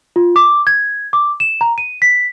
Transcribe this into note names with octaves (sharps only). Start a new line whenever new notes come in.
F4
D6
G#6
D6
E7
A#5
D#7
B6